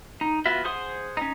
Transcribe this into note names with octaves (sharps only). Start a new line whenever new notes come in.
D#4
B3 F4 F#4 E5
G#4 C5 F#5 C6 D#6
C#4 D#4